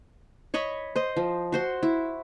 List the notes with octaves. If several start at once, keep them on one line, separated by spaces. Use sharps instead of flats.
C#5 D#5 B5 C#6
C5 D#5
F3
F#4 C5 C6
E4